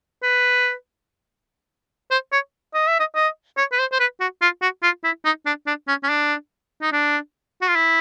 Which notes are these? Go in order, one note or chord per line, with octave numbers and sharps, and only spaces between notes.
B4
C5
C#5
D#5
E5
D#5
D#5
C#5
B4
C5
C5
B4
F#4
F4
F#4
F4
E4
D#4
D4
D4
C#4
C#4
D4
D#4
D4
F#4
F4
E4